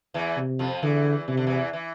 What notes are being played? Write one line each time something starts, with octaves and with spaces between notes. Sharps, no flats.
E2 E3
C3
F2 F3
E2 D3 E3
C3 E3
D3
E2 E3
E3